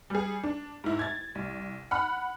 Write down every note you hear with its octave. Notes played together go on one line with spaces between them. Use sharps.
G3 G#4
D4
G#2 E4
G#6 A6
C2
F#5 B5 F6 F#6